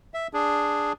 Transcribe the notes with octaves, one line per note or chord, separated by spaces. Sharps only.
E5
D4 G#4